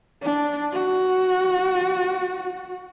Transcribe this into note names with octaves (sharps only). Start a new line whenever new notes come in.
D4
F#4